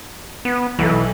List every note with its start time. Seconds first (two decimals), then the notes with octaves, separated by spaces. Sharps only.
0.45 B3
0.79 B1 E3 A4